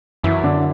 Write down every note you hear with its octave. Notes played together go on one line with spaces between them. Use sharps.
F#2 E3 E4
D3 D4